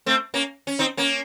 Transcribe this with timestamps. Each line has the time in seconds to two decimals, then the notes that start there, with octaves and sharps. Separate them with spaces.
0.06 A3 C4
0.34 A#3 C#4
0.67 C#4
0.79 C4 D#4
0.97 A#3 C#4